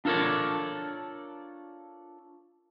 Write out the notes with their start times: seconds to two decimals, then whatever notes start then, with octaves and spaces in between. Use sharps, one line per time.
0.05 D4 F4 A4 A#4 C#5 D5